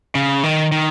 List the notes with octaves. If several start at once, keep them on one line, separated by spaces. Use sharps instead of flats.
C#3
D#3
D#3